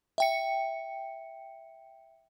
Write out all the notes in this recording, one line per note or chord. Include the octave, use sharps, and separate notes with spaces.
E5 G5 C#7